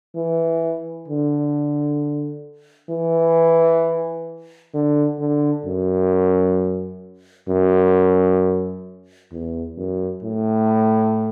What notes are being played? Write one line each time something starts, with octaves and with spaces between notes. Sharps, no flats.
E3
D3
E3
D3
D3
F#2
F#2
E2
F#2
A2